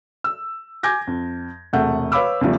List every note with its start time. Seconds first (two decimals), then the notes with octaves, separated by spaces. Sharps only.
0.24 E6
0.83 G#5 D6 G6 G#6 A#6
1.07 F2
1.73 E1 C3 A3 F#5 G6
2.12 B4 C#5 F5 B5 D6 E6
2.41 E2 C#3 F3 G3 A3